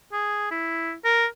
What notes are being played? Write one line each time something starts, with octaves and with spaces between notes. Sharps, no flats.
G#4
E4
A#4